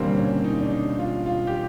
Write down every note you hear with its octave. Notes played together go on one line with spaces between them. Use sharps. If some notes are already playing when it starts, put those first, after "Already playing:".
Already playing: E1 D#2 D3 G3 A#3 C4
C#4
D#4
D4
D#4
F4
F4
G4